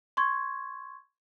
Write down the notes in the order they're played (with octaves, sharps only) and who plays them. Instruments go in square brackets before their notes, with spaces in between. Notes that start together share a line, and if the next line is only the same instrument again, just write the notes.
[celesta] C6 C#6 G#6